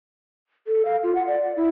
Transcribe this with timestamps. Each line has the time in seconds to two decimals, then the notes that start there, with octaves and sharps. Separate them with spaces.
0.67 A4
0.85 F5
1.03 F4
1.15 F#5
1.28 D5
1.56 E4